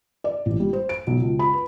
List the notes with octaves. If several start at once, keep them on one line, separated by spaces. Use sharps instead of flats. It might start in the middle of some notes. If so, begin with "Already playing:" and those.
D5
A1
G3
C5
D7
B1
C#2
B5
B4